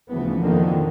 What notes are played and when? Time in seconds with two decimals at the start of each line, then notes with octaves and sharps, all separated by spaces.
0.11 D2 C#3 E3 F3 B3
0.41 F2 B2 D3 D#3 F3 A#3